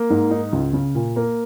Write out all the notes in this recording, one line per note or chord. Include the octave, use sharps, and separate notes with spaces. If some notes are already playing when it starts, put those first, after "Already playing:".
Already playing: A#3
G#2
D#4
C#2
C#3
A#2
A#3